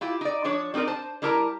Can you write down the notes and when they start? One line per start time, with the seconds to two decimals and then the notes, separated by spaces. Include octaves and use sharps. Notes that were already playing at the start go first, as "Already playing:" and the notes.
0.01 E4 F4 G4
0.21 D#4 D5
0.44 F3 D4 C#5
0.74 G3 C4 D#4 A#4 D5
0.87 C5 A5
1.22 G3 E4 G4 A#4 A5 A#5